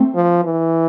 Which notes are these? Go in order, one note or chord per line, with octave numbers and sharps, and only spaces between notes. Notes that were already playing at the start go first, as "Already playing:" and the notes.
Already playing: A3 C4
F3
E3